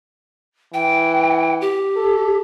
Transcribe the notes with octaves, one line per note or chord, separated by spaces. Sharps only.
E3 G5
G4
A4